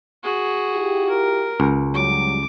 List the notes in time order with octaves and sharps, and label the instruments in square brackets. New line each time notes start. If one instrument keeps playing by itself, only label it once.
[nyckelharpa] F#4 G#4
[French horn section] E4 F4 G4
[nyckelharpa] A#4
[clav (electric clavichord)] C#2
[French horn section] F#3 G3 [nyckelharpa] D6